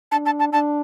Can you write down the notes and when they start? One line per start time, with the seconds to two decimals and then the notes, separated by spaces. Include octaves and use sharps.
0.12 D4 A5
0.26 A5
0.40 A5
0.53 D4 A5